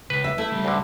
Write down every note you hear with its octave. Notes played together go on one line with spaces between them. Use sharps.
C#2 B4
E5
A3 E4 E5
C#2 G3
D2 D3